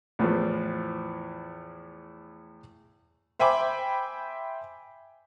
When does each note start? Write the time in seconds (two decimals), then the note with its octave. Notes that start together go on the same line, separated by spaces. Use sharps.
0.19 E2 A2 F3 B4
3.39 C5 E5 G5 G#5 B5 D6